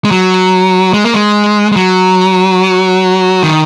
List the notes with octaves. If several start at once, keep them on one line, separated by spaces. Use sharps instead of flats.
G#3
F#3
G#3
A#3
G#3
G#3
F#3
D#3